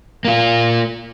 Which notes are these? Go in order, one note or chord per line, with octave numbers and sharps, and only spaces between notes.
A#3 F4